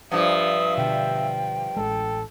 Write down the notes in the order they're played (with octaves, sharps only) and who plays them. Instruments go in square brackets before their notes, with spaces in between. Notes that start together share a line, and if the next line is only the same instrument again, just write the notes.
[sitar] G2 F3 [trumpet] E5 [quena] D#6
[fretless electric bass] B2 D3 [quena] G5
[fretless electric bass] A1 G#3 [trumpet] A4